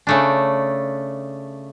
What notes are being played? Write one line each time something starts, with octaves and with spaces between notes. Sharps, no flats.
C#3 A3 D4